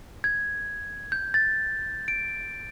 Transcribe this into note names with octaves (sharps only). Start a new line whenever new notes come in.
G#6
G6
A6
D7